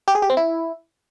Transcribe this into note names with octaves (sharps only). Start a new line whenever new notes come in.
G4
G#4
G4
C4
E4